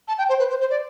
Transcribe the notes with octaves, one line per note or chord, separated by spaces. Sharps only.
A5
G5
C5
B4
C5
C5
D5